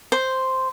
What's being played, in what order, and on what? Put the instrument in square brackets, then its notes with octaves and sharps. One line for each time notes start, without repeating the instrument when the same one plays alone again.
[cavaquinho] C5